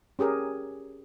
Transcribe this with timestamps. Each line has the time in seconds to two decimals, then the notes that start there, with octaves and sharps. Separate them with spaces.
0.19 C#4 G4 G#4 A#4